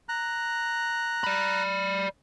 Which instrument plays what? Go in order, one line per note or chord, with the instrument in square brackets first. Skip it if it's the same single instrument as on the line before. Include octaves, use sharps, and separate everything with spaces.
[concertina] A#5 F#6
[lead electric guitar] D5 B5